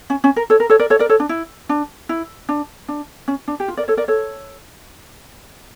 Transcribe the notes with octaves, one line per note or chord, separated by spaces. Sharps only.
C#4
C#4
A#4
A4 C#5
A#4
A4 C#5
A#4 D5
A4 C#5
A#4 D5
A4 C#5
D4
E4
D4
E4
D4
D4
C#4
D4
G4
F4
A#4 D5
A4 C#5
A#4 D5
A4 C#5